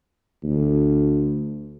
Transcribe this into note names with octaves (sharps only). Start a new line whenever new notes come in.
D2